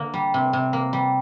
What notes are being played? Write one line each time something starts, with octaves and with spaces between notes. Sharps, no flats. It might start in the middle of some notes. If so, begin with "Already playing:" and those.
Already playing: D3 A#3 A#4
G3
C3
C3
A#3
G3